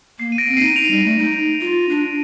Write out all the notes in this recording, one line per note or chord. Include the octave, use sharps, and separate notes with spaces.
A#3 C7
D#7
A#6 D7
C4
D#4 C7 D#7
D#4 D7 F7
G3
A3
D#4
F4
D4